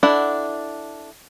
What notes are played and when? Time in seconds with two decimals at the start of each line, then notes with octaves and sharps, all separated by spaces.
0.03 D4 E4 A4 F#5